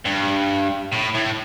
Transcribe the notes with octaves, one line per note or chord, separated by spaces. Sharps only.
G2
A2
A2